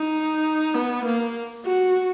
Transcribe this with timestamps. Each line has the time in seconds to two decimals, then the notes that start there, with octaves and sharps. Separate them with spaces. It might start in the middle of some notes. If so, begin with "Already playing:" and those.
Already playing: D#4
0.74 B3
1.05 A#3
1.66 F#4